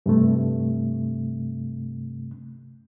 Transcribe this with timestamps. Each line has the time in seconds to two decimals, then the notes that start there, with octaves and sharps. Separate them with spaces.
0.06 G2 C3 A3